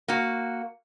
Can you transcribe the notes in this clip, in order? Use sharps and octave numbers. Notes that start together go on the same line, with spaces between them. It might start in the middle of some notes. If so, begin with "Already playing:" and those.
A#3 F#4